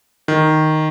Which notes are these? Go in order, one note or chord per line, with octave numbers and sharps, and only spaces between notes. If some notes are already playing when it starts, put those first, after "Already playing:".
D#3